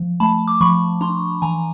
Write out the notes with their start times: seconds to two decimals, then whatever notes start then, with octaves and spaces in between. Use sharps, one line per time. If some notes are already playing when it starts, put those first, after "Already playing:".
Already playing: F3
0.20 A3 A5 B5
0.48 D6
0.61 F3 B5 C#6
1.01 D4 A#5 C6
1.42 E3 G#5 A#5